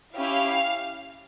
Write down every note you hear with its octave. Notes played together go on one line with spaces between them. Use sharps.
C#4 E4 G4 F5